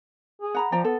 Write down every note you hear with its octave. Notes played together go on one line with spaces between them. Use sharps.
G#4
F#5 A#5 B5
F3 D5 G5 A#5
B3 A4